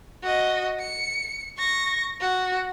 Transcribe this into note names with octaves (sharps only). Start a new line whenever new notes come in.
F#4 D#5
C#7
C#6 A#6
F#4